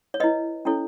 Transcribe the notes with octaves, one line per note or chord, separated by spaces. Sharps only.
C#5
E4 B4 D#5
C#4 E4 A4 C#5